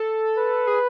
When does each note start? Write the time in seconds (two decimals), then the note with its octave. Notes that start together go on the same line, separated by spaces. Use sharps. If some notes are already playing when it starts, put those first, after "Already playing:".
Already playing: A4
0.38 B4
0.67 G#4